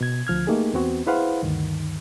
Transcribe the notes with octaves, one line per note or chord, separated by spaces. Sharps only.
B2 G#6
D2 F3 F6 G#6
A3 A#3 D#4 G4 G#4
E2 B3 C4 F#4
E4 G#4 B4 C5 F5 F#5
D2 G2 D#3